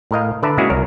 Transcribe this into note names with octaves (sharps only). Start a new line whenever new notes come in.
A2 A#4 D#5 F5
D3 B4 D5 E5 A5 A#5
C#3 G#3 A#3 E4 F#4 G#4
C2 A#4 C#5